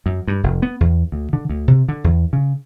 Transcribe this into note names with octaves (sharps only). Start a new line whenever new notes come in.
F#2
G2
F1
B3
E2
D2
D3
D2
C3
D3
E2
C#3